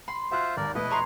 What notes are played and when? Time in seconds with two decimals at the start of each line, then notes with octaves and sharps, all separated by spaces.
0.08 B5 C6
0.31 F4 F#4 C5 E5 F6 F#6
0.57 G#1 D#2 A#4 D5
0.75 F1 B2 A3 E4 B4 D#5
0.90 C#5 A#5 C6